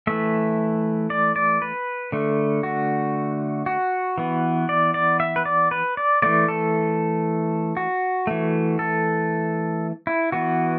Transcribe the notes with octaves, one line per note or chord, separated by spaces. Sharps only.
E3 A3 E5
D5
D5
B4
D3 A3
F#4
F#4
E3 B3
D5
D5
E5
B4
D5
B4
D5
E3 A3 D5
A4
F#4
E3 A3
A4
E4
E3 B3 F#4